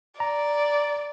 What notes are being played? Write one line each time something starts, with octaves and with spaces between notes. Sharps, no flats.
D5 A#5